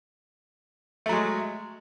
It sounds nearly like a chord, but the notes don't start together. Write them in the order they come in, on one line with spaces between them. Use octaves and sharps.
A3 F#3 G#3